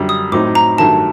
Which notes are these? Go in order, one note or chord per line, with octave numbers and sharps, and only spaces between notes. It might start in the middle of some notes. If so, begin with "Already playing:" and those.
Already playing: F#2 D3 G3
D#6
A2 F#3 C4 D#4 D6
A#5
G2 D#3 F#3 A3 A5